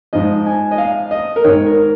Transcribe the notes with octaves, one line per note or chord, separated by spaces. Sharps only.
G#2 F3 D#5
G#5
D#5
F5
D#5
A#4
G#2 D#3 C#5
A#4